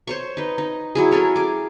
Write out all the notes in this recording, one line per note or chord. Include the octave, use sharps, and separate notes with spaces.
C5 C#5 C#6
D#4 B4
D#4
F#3 E4 G#4
C#4 A4 A#4 C#5
G#4 D6